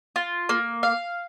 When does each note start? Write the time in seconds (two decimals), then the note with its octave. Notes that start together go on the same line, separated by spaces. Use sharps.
0.16 F4
0.49 A#3
0.83 F5